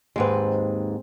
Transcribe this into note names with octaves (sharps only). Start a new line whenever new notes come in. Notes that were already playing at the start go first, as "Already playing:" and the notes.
D#2 G#2 G#3 C4 B4